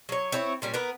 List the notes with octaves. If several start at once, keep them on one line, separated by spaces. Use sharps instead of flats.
F#3 C#5
C4 E4 C#5
A#2 G3 C#4
B3 A#4 B4